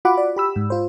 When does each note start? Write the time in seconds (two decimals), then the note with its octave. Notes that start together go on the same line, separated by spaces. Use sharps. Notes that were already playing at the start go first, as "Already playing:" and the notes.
0.05 F4 F#4 F#5 B5 D6
0.18 D5
0.36 G4 B5 E6
0.56 G#2
0.70 F4 C5